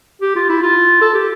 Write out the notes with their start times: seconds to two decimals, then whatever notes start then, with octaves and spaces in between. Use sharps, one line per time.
0.22 G4
0.36 F4
0.49 E4
0.62 F4
1.01 A4
1.14 G4